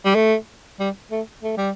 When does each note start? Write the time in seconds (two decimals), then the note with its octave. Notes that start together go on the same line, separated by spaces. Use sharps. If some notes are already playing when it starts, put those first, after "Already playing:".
0.05 G3
0.15 A3
0.80 G3
1.12 A3
1.43 A3
1.57 G3